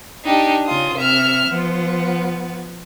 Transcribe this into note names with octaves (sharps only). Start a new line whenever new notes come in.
D4 D#4 G4
C#3 F4 D#6
C3 E5 F6
F3 B3